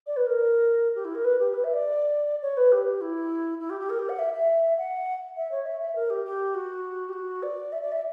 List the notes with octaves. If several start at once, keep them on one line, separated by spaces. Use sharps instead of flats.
D5
B4
A#4
G4
E4
A#4
B4
G4
B4
E5
D5
C#5
B4
G4
E4
E4
G4
G4
A#4
G4
F#5
E5
E5
F#5
E5
C#5
E5
E5
A#4
G4
G4
F#4
G4
F#4
D5
E5
D5
E5